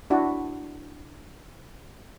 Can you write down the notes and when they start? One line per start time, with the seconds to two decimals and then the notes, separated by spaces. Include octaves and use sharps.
0.10 D4 E4 F#4 D5